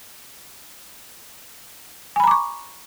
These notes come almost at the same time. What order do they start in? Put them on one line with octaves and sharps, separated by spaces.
G#5 B5 A#5 D6 C#6